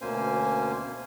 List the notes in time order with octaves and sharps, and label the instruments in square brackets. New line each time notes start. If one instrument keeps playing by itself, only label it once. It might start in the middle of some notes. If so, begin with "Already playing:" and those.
[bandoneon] D2 B2 A#3 C#4 C5 G#5